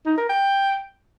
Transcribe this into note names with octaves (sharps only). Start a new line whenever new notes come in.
D#4
A#4
G5